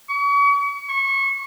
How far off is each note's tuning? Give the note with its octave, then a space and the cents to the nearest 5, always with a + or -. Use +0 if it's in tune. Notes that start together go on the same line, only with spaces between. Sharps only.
C#6 +40
C#6 -25